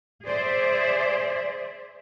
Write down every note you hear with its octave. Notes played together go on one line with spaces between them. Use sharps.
G#4 C5 D5 E5